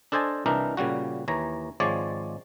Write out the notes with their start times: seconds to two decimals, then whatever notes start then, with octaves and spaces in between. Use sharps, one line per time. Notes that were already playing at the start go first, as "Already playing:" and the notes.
0.12 D4 A4 C5 D#5 G#5 A5
0.46 C2 E3 D4 D#4 A#4
0.77 A#2 C#3 G3 F#4
1.28 D#2 E3 C#5 A#5
1.80 G#1 F3 G#3 C#5 D5